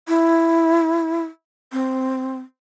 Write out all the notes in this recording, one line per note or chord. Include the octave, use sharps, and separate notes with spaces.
E4
C4